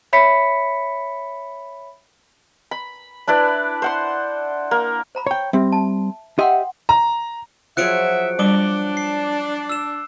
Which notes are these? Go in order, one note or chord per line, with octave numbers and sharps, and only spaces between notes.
C#5 E5 B5 B6 C#7
B5
D4 E4 B4 D5
C5 F#5 C6
A#3
C5 A#5 B5
C#5 G5
G3 C4 E5
A5
G4 D#5 E5 F#5 G5 C6
A#5
F3 F#3 F#4 G#4 E5 F#6 C#7 D7
G3 D4 D6 G7
C7
E6 E7